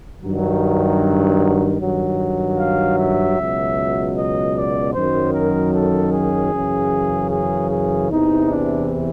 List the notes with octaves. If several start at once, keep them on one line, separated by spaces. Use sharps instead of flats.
G2 D#3 F#3
G2 D#3 F#3
F5
E5
C#2 B2 F#3
D#5
D5
F#2 D#3 F#3 C5
A#4
A4
G#4
F#2 C#3 E3
G#4
G#4
E2 C3 E3 D#4
D4